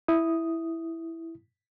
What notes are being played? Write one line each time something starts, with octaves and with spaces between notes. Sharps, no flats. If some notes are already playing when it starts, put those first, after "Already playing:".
E4 D#6